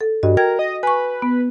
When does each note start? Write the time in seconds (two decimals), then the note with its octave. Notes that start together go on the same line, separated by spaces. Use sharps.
0.01 A4
0.23 G2 F#4 D#5
0.37 A#4 G5 G#6
0.59 D#5
0.83 B4 G#5 C#6
1.22 B3